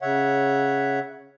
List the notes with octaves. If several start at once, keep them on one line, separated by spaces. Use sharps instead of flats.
C#3 C#5 E5 F#5